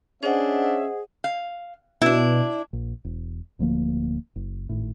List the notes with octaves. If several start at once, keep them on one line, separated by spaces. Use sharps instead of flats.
C#4 D4 G#4 C5 D#5 E5 F#5
F5
B2 D4 E4
A#1
E1
D1 D2 F3 A#3
F#1
G#1 A2